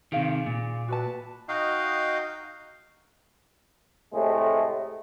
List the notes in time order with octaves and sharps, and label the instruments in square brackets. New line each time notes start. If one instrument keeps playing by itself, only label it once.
[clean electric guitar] C3 D#3 [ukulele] G#4 F5
[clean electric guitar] A#2
[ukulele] F#4 B4 A5
[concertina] D#4 F#4 D#5 F5 G5
[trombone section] A2 C3 G#3 A3